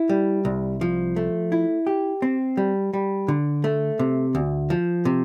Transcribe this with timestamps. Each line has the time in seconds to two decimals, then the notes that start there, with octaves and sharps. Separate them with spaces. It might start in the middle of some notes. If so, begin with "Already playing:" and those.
Already playing: E4
0.09 G3
0.45 C2
0.81 F3
1.16 A3
1.52 E4
1.87 G4
2.22 C4
2.57 G3
2.93 G3
3.28 D3
3.64 A3
3.99 C3
4.35 D2
4.70 F3
5.05 C3